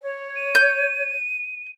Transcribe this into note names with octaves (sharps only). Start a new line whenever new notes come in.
C#5
D#7
G6